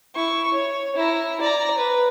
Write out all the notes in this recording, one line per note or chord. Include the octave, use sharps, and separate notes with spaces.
E4 C#6
C#5
E4 A#5
D5 A#5
B4